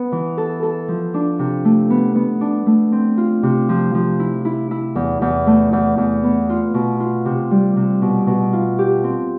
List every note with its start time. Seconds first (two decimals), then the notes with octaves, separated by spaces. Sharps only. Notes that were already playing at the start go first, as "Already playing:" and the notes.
Already playing: B3
0.12 E3
0.38 A4
0.63 A4
0.88 F3
1.14 D4
1.39 C3
1.65 A3
1.90 B3
2.15 B3
2.41 D4
2.66 A3
2.92 C4
3.17 F4
3.43 C3
3.69 F3
3.94 F3
4.19 E4
4.45 E4
4.71 E4
4.95 E2
5.22 E2
5.46 A3
5.73 E2
5.98 E2
6.23 B3
6.49 F4
6.74 B2
7.00 F4
7.25 C3
7.51 G3
7.76 C3
8.02 B2
8.27 B2
8.53 F4
8.79 G4
9.04 C4